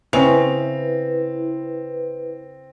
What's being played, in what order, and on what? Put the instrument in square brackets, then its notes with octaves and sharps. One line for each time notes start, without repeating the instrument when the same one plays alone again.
[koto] C#3 [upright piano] C4 F7 [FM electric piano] E4 B4